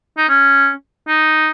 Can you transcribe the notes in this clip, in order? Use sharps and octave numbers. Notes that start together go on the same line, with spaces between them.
D#4
C#4
D#4